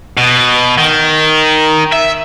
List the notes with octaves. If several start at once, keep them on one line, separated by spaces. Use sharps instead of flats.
B2
D#3
E5